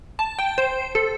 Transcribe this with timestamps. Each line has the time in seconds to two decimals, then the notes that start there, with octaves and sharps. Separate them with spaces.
0.19 A5
0.39 G5
0.58 C5
0.95 A4